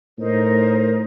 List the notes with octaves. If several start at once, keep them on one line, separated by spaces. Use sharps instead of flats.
A2 D#4 A#4 C5